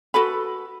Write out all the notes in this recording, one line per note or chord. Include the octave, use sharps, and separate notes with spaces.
F#4 A4 B4 B5